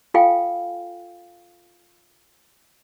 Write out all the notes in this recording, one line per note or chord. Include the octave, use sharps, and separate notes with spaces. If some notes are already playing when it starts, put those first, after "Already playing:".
F4 A4 F5 G5 G#5